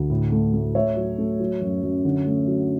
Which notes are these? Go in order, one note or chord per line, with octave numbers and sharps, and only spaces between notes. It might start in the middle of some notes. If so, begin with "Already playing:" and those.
Already playing: D2
A2
A3
A3
A3 C#5 E5
F#3
A3
F#3
F#2
F#2
D3
A3
F#3